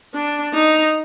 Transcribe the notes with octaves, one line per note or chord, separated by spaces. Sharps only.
D4
D#4